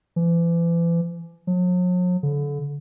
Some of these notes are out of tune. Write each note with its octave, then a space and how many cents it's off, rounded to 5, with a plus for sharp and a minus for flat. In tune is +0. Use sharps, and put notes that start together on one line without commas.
E3 +40
F#3 -45
D3 -30